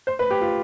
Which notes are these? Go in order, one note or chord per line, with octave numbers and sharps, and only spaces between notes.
C5
B4
G4
F4